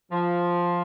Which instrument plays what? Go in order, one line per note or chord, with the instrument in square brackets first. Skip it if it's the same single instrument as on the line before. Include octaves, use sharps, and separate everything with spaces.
[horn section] F3